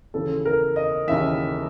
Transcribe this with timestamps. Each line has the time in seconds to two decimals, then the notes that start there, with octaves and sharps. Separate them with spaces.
0.14 D#2 C#3 E3 A4
0.45 A#4
0.76 D#5
1.08 D#2 C#3 E3 E5